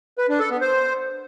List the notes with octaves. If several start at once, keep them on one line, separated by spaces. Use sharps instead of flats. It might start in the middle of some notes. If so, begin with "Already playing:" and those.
B4
D4
A4
B3
C5